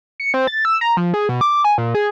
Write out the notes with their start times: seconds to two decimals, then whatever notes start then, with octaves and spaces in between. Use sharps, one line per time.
0.20 C#7
0.34 C4
0.47 A6
0.65 E6
0.81 A#5
0.97 F3
1.14 G#4
1.29 B2
1.41 D6
1.64 G#5
1.78 A#2
1.95 G#4